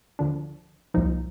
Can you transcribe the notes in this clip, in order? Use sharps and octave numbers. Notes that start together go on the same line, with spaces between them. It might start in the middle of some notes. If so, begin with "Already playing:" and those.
D2 D3 F3 D4
C2 A#2 F3 D#4